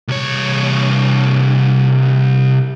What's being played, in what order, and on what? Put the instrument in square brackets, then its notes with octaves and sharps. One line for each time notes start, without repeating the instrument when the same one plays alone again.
[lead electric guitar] C2 C#5